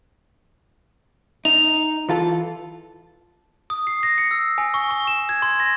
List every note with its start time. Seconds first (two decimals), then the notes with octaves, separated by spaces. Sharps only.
1.45 D#4 F7
2.09 E3 F4 A4
3.70 D#6
3.87 C7
4.03 A#6
4.18 C#7
4.31 E6
4.58 G#5
4.74 C#6
4.91 C#6
5.07 E7
5.29 G#6
5.42 C6
5.60 A#6